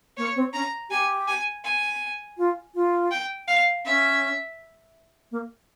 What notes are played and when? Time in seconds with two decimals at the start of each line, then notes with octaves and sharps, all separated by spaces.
0.17 A#3 C#5
0.36 C4
0.53 C#4 A#5
0.90 G4 G#5
1.27 G#5
1.64 G#5
2.38 F4
2.75 F4
3.11 G5
3.48 F5
3.85 C#4 E5
5.31 A#3